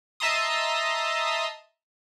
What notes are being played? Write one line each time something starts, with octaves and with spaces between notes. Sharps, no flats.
D#5 E5 A5 A#5 C6 D#6